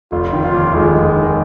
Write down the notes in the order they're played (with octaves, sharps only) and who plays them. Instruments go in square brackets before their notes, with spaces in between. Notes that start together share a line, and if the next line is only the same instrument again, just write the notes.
[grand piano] F1 [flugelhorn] F4
[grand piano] D#3
[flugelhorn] F4
[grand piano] D#2
[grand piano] F1 [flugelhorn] G#3
[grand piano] F1
D#3